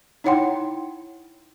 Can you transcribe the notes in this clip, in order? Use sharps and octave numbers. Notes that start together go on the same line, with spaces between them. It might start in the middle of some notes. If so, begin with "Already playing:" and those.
D#4 E4 C#5 F#5 G5 C6